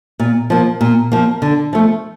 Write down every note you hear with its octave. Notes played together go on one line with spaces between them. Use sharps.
A#2
F3 A#3
A#2
F3 A#3
D3
F3 A3